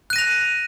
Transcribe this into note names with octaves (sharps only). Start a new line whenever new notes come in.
F#6 A#6 D#7 F7